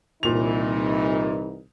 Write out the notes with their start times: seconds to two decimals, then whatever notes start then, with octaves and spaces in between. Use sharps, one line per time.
0.23 C2 A#2 E3 D#4 F7